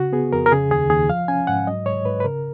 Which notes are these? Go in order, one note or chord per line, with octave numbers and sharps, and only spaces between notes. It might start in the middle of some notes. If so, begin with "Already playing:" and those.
Already playing: C#3 F#4
B3 G#4
F2 A#4
A#4
C#3 G#4
D#2 G#4
D#2 G#4
F3 F5
C#4 G#5
G#2 F#5
F#3 D#5
G#2 C#5
G#2 B4
B4
C#3 A#4